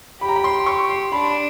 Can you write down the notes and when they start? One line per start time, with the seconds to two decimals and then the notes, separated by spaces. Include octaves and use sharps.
0.21 G4 B5
0.29 A#5
0.36 B5
0.44 C6
0.66 C#6
0.90 C6
1.12 D4 B5